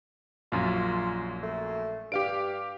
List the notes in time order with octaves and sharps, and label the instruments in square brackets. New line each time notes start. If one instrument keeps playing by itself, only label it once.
[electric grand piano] A#1 F#2 [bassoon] F4
[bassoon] A3
[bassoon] G2 [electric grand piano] G4 F5 D7